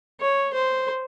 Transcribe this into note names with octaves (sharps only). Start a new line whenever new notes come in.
C#5
C5